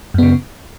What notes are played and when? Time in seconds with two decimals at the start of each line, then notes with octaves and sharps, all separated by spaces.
0.14 F#2
0.18 B3
0.22 C#3